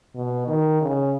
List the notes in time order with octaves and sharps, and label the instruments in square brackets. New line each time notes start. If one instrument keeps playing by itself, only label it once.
[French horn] B2
D#3
C#3